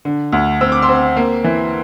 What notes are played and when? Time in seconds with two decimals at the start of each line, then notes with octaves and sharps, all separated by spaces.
0.05 D3
0.32 D2
0.61 C4 E6
0.72 D6
0.82 C6 E6
0.89 C4
1.17 A#3
1.44 E3